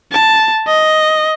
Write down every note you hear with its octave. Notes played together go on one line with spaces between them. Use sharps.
A5
D#5